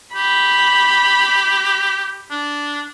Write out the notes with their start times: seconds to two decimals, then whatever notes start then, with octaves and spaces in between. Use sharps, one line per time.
0.15 G4 B5
2.31 D4